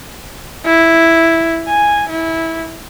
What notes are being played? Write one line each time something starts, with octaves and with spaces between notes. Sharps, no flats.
E4
G#5
E4